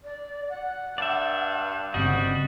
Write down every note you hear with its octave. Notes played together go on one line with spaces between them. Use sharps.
D5
F#5
G2 D5 E5
G1 G2 C#3 G3 C4 F#4 D#5